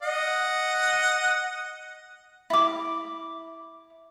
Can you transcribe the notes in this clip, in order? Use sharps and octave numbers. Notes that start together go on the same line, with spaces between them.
D#5 F#5
E4 D6